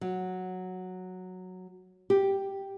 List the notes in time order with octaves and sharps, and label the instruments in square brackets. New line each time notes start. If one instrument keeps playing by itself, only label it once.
[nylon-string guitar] F#3
G4